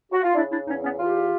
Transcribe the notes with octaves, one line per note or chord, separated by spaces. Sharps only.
F#4
F4
C#3 D4 E4
D4 E4
E2 C#4 D#4
B3 C#4
E2 F4 G4